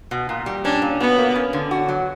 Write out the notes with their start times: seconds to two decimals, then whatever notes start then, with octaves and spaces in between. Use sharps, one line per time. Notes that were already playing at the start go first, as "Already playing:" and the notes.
0.11 B2
0.29 A#2
0.46 G3
0.65 C#4 D4
0.82 A#2
1.00 B3 F#4
1.18 A#3
1.36 C#4
1.53 D3
1.71 F#4
1.89 F#3